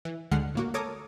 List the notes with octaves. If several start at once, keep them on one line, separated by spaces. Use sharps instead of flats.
E3
D2 D3 G#3 F#5 F6 C7
A2 A#3 F#4
A4 A#4 C#5 D6 D#6